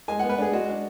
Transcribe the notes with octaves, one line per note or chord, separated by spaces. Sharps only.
G#3 G#5
B3 F#5
B4
D4 G#4
G#3 F#4
D4